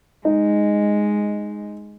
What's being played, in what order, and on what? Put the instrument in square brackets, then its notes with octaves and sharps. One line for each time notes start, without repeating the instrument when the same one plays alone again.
[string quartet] G#3 [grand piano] D#4